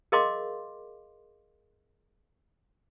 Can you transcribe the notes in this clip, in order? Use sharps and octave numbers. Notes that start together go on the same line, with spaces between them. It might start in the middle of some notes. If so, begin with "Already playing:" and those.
G#4 A#4 D#5 F5 C6 D6